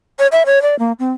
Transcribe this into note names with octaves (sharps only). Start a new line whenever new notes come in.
C#5
E5
C#5
D5
A#3
C4